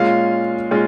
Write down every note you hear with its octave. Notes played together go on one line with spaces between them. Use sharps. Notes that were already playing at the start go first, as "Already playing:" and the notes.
Already playing: A#2 G#3 C#4 F4 F5
A#2 G#3 C#4 F4